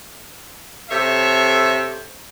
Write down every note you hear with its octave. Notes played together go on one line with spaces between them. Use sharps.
C3 A4 C#5 E5